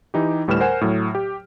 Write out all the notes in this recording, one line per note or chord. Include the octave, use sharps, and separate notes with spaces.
E3 D#4 G4
D2 A2 G3 B4 F6 E7
A#4 C5 F#5 G#5
A2 F#3
G4